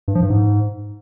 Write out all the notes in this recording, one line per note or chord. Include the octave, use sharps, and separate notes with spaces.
G2
F3
G2
G#2